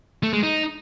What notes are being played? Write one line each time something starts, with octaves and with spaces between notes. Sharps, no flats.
A3
G#3
D#4